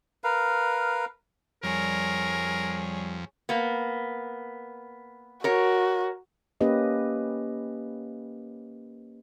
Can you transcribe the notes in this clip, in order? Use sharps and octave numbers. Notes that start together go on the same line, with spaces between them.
A#4 B4 F5
F2 G3 G#4 A#4 C#5
A#3 B3
F#4 A#4 C#5
A#3 C#4 G4 B4 D#5